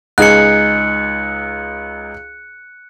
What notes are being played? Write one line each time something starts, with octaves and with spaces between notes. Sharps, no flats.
C#2 D#4 G#4 F#6 C#7